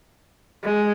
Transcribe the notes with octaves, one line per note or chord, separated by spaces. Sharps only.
G#3